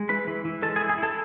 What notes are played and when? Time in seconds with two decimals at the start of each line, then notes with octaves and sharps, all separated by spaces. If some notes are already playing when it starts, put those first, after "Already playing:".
Already playing: G#3
0.09 E3 B4 B5
0.28 E3
0.45 E3
0.62 G#3 A4 A5
0.76 G#4 G#5
0.81 E4
0.90 G#4 G#5
0.98 E4 A4 A5